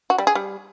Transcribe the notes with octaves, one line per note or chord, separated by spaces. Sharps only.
F#4
G3
G#4
G3